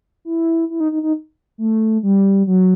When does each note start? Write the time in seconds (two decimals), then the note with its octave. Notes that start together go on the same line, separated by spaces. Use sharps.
0.25 E4
0.70 E4
0.80 D#4
0.92 D#4
1.03 D#4
1.58 A3
2.03 G3
2.47 F#3